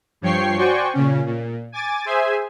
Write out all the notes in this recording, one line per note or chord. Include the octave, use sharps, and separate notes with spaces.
G2 F3 C#5 G5 C#6 C7
F#4 C5 D5 G5 G#5 C#6
A#2 C#3 C#4
A#2
G#5 D6 A6
G#4 C5 E5 G#5